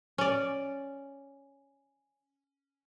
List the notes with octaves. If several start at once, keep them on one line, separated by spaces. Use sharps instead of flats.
C#4 D5